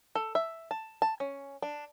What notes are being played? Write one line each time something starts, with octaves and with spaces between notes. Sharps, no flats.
A4
E5
A5
A5
C#4
D4